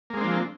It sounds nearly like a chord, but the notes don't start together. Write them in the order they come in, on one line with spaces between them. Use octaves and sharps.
A#3 G#3 C4 D4 F3